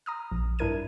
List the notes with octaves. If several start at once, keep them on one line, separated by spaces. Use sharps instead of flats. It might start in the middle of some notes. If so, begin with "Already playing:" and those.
A#5 D#6 F6
A#1
G2 D4 E4 A#4 G#6 D#7